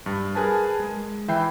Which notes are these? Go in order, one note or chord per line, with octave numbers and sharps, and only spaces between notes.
G2
G#4 A#4 B4 G#5 A5
G#3
E3 E5 G5 B5 G6 C7